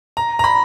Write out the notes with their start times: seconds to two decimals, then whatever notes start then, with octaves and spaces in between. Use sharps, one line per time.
0.17 A#5
0.39 A#5
0.44 B5